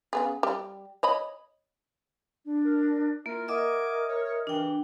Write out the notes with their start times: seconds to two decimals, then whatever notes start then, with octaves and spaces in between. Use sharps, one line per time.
0.13 C#3 B3 G#4
0.43 G3 G4
1.03 C#5 D#5 B5
2.45 D4
2.65 A#4
3.26 A#3 E4 F4 A#4
3.48 A#4 D#5 E5 F#5 G#5 D6 D#6
4.08 C#5
4.47 G2 C#3 E3 D4 G5